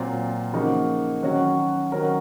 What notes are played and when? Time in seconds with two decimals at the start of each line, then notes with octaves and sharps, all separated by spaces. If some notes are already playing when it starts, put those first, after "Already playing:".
Already playing: A#2 F#3 C4 F4
0.53 C#3 F3 A#3 D#4 F#4
1.22 D#3 F#3 C#4 F#4
1.92 D#3 F#3 C#4 F#4 A#4